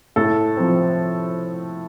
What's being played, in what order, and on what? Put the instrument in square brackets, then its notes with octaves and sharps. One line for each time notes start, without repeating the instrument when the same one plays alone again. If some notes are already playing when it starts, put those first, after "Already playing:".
[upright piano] A2 A4
F3 C4